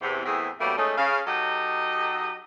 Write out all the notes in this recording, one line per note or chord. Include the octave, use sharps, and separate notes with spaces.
E2 C3
E2 A2 C4 G4 G#4 E5
B2 G3 A3 A#3 C#4 G4
G#3 A3 C#4 D#4 G#4
C#3 F5
F#3 D#4 G4 A4 D#5